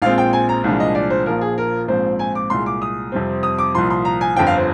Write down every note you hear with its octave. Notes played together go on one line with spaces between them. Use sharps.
A#1 A#2 G#3 C4 F5
G5
G#5
A#5
C2 A#2 F3 G#3 D4
D#5
D5
C5
A#1 A#2 F3 A#4
G#4
A#4
A#1 G#2 F3 C4 C5
G#5
D6
C2 A#2 G#3 C6
D6
D#6
F2 C3 G3 C4
D#6
D6
C2 A#2 F3 C6
C6
A#5
G#5
G1 F2 D3 F3 G5
F5
C5